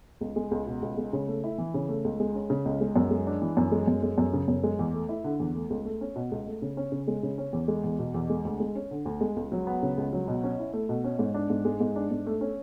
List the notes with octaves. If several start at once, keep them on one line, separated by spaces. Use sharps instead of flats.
C#2
G#3
C#2
B2
C#2
G#3
C#3
A3
E4
E3
C#3
A3
C#2
G#3
C#4
C#3
C#2
G#3
F#2
G#3
D4
E3
F#2
G#3
F#2
G#3
F#2
C#3
F#2
G#3
E2
A3
E4
D3
E2
A3
C#2
A3
C#4
B2
C#2
A3
C#3
C#4
C#3
G#3
C#3
C#4
E2
G#3
E2
B2
E2
G#3
D2
G#3
C#4
D3
D2
G#3
C#2
F#3
B3
C#3
C#2
F#3
B2
C#4
E4
A3
B2
C#4
G#2
D4
G#2
G#3
G#2
D4
G#2
A3
C#4